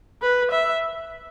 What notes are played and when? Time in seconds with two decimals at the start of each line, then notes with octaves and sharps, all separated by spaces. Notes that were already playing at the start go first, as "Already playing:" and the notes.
0.22 B4
0.51 E5